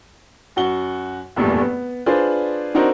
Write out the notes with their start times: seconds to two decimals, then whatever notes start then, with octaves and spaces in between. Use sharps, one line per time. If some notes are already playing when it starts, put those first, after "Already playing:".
0.56 F#2 F#4 F#5 G7
1.36 F1 E2 G2 A#2 A3
1.61 B3
2.06 D4 F4 G#4 B4 C5 D5
2.74 C4 D4 D#4 F#4 A#4 C5